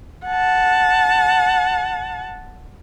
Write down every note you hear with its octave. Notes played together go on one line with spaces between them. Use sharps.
F#5 A5